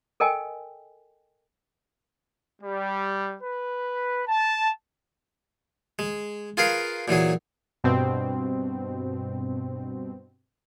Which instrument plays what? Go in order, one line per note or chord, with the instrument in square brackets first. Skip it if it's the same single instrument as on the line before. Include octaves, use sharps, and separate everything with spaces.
[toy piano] A4 A#4 D#5 G5 G#5
[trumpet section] G3
B4
A5
[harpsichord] G#3
F4 G#4 A#4 B4 F5
A#2 E3 F#3 G#4
[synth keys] G2 B2 C4